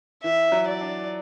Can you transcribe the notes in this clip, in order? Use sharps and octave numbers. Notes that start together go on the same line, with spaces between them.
E3 E5
F#3
D5
D4